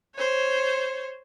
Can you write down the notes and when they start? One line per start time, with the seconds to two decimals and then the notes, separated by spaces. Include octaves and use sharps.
0.15 C5 C#5